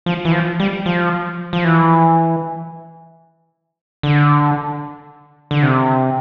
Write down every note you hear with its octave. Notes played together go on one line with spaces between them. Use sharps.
F3
E3
F3
G3
F3
F3
E3
D3
D3
C3